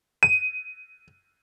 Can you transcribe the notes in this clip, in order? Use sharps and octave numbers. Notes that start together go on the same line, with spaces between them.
D#7